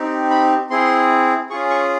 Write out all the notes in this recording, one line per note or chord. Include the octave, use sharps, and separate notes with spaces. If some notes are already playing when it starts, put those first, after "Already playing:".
Already playing: C4 D#4 G4
B5
C4 E4 G#4 C6
C#4 F4 G#4 C#6
C#6